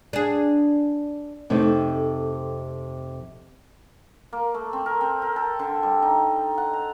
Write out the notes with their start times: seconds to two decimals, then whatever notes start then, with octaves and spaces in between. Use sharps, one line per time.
0.13 D4 G#4
1.50 F2 C3 A3 D#4
4.33 A#3
4.54 A3
4.73 C4
4.86 A#4
5.01 C4
5.22 A#4
5.36 A4
5.59 D3
5.83 G3
6.02 D#4
6.58 F#5
6.73 A#5